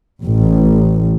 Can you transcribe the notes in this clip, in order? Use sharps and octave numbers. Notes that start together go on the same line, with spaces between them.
A1